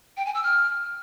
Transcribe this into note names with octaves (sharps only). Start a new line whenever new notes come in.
G5
G#5
E6
F6